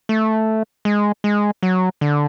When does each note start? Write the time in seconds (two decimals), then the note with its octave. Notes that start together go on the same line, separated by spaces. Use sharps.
0.09 A3
0.85 G#3
1.24 G#3
1.63 F#3
2.01 D3